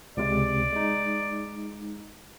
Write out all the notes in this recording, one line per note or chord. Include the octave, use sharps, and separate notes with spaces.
C#2 C3 G#3 D5
G#3 D#4